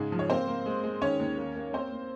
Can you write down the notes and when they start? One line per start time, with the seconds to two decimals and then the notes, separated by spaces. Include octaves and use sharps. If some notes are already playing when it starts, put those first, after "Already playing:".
Already playing: G#2 C#3 G#3 G#4
0.12 F3
0.19 C#5
0.30 A#3 C4 C5
0.48 A#3
0.66 G#3
0.83 G#3
1.02 D#3 C#4 C#5
1.20 D#2
1.37 A#3
1.56 A#3
1.73 A#3 C4 C5
1.92 A#3